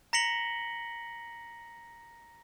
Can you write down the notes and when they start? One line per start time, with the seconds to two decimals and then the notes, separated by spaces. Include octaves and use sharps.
0.13 A#5 A#6 B6 C#7 F#7 G7